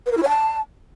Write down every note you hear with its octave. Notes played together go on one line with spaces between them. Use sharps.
B4
A#4
E4
C#5
A5